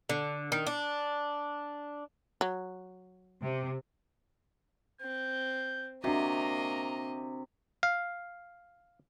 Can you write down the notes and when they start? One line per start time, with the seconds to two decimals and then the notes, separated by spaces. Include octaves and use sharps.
0.09 D3
0.52 D#3
0.67 D4
2.41 F#3
3.42 C3
5.01 C4 G6
6.04 C3 A#3 D4 F#4 D#5 A#5
7.83 F5